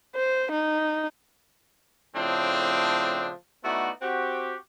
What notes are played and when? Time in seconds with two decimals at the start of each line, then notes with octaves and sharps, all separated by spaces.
0.16 C5
0.52 D#4
2.15 A2 C#3 F3 A3 C4 D4
3.64 A3 B3 D#4 E4 F#4 D5
4.02 C4 F#4 G4